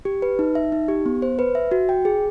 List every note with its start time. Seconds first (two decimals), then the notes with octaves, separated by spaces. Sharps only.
0.05 G4
0.22 B4
0.39 D#4
0.55 E5
0.72 D#4
0.88 G4
1.06 B3
1.22 C5
1.39 B4
1.55 E5
1.71 F#4
1.89 G5
2.05 G#4